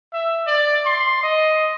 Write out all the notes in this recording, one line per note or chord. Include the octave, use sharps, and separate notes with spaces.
E5
D5
C6
D#5